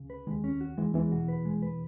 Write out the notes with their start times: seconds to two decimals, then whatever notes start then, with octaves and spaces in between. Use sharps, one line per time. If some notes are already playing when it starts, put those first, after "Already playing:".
Already playing: C#2 C#3
0.10 B4
0.27 D#2 D#3 G#3
0.44 C#4
0.61 F#4
0.77 E2 E3 G#3
0.94 E2 E3 G#3
1.12 B2 F#4
1.28 B4
1.45 G#3
1.62 B4